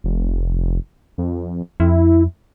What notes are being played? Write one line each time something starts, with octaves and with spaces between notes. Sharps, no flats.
F1
F2
F2 E4